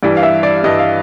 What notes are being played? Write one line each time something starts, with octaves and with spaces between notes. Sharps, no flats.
G2 E3 G3 D5
F5
E5
D5
G2 E3 G3 D#5
F5